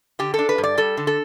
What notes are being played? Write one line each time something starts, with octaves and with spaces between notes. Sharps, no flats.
D3 G4
A4
D4
B4
G2
D5
G3 A4
D3
A4